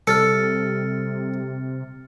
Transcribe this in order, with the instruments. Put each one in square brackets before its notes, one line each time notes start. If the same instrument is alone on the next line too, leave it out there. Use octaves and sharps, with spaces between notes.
[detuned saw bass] C3 [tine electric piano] G3 [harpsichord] A4 [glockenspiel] F6 A6 C#7